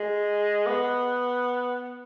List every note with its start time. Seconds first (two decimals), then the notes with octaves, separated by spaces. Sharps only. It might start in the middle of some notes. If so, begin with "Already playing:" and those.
Already playing: G#3
0.67 B3